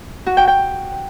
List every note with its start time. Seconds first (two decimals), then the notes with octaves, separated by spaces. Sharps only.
0.26 F#4
0.37 G5
0.47 G5